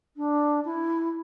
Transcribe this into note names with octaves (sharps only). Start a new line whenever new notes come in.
D4
E4